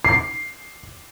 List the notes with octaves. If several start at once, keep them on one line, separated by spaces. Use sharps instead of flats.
C7